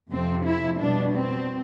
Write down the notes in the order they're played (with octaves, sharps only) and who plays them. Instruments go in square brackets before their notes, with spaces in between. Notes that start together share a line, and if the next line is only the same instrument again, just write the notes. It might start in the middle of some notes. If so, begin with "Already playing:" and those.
[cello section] F2 C3 F3 C4
E4
B2 G3 D4
C4